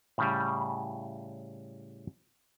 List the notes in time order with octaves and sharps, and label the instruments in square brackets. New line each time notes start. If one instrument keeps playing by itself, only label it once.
[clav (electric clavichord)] A2 C#3 G3